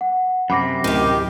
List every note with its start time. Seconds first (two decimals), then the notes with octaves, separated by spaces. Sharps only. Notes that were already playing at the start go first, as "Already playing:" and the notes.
0.01 F#5
0.50 F#2 C3 F#5 B5 D6 A#6
0.84 D2 A2 D#3 G4